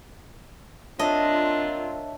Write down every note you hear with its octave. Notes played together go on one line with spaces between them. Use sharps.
A#3 C4 D4 F4 C#5 D#5 E5 A5